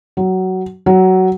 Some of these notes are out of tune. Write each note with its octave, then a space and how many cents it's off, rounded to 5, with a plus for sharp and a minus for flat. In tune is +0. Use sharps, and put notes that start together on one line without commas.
F#3 +15
F#3 +15